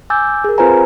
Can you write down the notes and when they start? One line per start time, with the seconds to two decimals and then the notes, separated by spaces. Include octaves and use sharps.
0.10 G#5 D6 E6 G6 A6
0.44 G#4 A#4
0.58 C4 F4 B4 C5 G#5 A#5